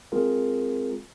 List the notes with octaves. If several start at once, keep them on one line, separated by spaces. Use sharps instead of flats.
G#3 C4 F4 G#4 A#4